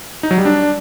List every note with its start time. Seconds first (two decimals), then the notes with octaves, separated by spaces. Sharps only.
0.23 D#4
0.31 F#3
0.38 G3
0.45 D4